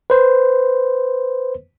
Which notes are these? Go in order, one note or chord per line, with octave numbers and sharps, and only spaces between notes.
B4 C5